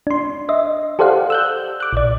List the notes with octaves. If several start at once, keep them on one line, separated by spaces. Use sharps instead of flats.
D4 C6
D#5 E5
G4 A4 C5 D5 F5 F#5
E6 F#6 G6
D6 F#6
A#1 D5